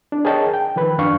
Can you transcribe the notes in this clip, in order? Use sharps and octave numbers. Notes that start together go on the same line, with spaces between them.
D4
G#4 A#4 C#5 D#5 G5 A5
G5
D#3 F3 B4 B5
F#2 D4 F5 C#6